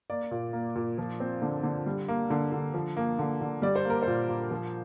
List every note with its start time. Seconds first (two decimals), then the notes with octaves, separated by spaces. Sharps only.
0.10 A#3 D5
0.31 A#2
0.53 A#3
0.75 A#2
0.98 F3
1.20 C4
1.42 D3
1.63 D3
1.86 G3
2.08 A#3
2.30 D3
2.52 D3
2.74 F3
2.97 A#3
3.19 D3
3.41 D3
3.62 G3 D5
3.76 C5
3.85 A#3 A#4
4.03 A#2 C5
4.29 A#2
4.51 F3